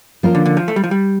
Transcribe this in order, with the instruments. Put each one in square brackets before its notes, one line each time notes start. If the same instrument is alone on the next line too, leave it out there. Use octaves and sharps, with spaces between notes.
[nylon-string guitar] F3 A#3 C#4 F4 A#4
[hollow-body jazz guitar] D3
D3
F3
A3
G3
F3
G3